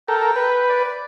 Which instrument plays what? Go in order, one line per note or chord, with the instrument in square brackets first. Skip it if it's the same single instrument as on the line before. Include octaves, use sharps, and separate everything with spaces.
[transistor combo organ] A4 A#4 [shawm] G5
[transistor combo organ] B4
[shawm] D5